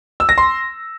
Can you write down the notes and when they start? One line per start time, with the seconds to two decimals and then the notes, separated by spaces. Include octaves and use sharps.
0.20 E6
0.29 A#6
0.38 C6